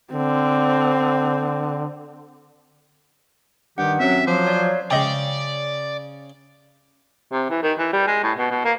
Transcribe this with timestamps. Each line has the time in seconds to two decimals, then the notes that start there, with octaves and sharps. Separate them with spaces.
0.13 D3 C4
3.78 G2 D#3 G4 F#5
4.00 F#2 F#3 C4 E5
4.27 F3 F#3 C5 D6
4.46 C#5 D5 F5
4.91 C#3 G#3 D5 D#5 G5
7.33 C3
7.50 E3
7.63 D#3
7.79 E3
7.93 G3
8.07 G#3
8.24 A2
8.38 B2
8.51 B2
8.65 A#3